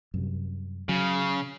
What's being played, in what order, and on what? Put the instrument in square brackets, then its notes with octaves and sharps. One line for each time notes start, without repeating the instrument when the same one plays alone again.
[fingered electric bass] F#2 C3 G3
[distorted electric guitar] C#3 [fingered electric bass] F#3